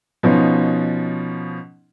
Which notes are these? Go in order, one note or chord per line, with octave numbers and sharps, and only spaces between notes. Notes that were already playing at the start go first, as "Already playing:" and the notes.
B2 F3 C#4 D#4